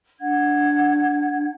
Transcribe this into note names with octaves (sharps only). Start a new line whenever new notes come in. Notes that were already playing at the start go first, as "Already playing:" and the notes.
D4 F#5 G#6